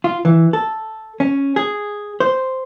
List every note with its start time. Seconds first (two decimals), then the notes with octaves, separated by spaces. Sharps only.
0.04 F4
0.25 E3
0.53 A4
1.20 C#4
1.56 G#4
2.20 C5